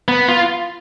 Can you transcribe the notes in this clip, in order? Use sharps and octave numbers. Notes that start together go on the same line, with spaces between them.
B3
F4